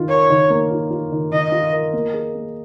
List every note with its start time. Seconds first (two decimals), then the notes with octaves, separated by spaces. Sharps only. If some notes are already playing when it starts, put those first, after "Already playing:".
Already playing: D#3 F4
0.09 A#4 C#5
0.30 D#3
0.50 A#3
0.71 F4
0.90 F4
1.12 D#3
1.32 D#3 D#5
1.52 F4
1.73 A#4
1.93 A#3
2.14 G#4
2.35 A#3